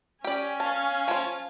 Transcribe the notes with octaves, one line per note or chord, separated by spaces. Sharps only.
C#4 G4 D5 G#5
C#5 F5 A5
F3 F4